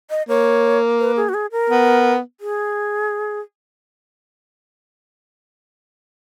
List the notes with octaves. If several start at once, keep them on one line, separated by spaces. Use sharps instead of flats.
D#5
A#3 C#5
B4
G#4
F#4
G#4
A#4
B3
G#4